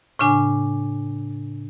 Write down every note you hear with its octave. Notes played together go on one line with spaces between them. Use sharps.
A2 C#3 D4 G#5